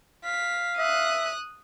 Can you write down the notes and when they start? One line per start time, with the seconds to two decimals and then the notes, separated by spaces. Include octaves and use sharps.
0.25 F5 B6
0.78 E5 D#6 F#6